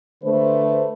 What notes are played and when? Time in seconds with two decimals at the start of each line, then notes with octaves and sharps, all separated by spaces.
0.24 D3 A3 B4 C5